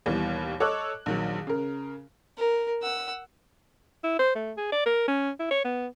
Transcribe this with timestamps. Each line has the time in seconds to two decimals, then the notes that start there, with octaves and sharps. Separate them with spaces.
0.06 D#2 B2 E3 G3
0.60 A4 C#5 D#5 D6 E6 F#6
1.06 A#1 D#3 F#3
1.47 C#3 A#4
2.38 A#4
2.82 F#5 E6
4.04 E4
4.19 C5
4.35 A3
4.57 G#4
4.72 D5
4.86 A#4
5.08 C#4
5.39 E4
5.51 C#5
5.65 B3